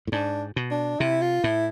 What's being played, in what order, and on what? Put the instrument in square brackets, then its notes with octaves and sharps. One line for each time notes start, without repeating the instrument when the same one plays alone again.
[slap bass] A2
[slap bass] G#2 [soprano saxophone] D4
[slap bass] B2
[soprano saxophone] D4
[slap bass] C3 [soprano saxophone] E4
[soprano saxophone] F4
[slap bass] A2 [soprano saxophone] E4